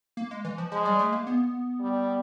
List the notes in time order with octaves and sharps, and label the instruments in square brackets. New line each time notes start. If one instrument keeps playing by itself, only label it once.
[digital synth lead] A#3
G#3
E3
F3
[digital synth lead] F3 [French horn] G#3
[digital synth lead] G3
A3
A#3
B3
[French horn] G3